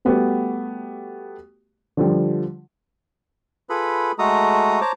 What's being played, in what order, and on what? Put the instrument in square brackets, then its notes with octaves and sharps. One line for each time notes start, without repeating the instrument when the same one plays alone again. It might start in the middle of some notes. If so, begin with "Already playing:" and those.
[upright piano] G3 A3 B3 F#4 G4
D3 F3 G3
[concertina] F4 G#4 A4 B4 B5
G#3 A3 F#4 A4 A#5 D#6
C5 C#5 A5 A#5 D6